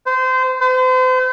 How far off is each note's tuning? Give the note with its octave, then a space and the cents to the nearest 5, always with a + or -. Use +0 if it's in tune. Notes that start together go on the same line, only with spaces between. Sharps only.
C5 -25
C5 -40